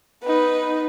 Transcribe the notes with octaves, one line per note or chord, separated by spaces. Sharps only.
B3 D#4 B4